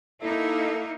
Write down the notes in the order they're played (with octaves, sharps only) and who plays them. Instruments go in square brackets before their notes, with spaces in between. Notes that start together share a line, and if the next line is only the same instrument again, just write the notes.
[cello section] A#3 D#4 [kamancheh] E4 E5 [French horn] A4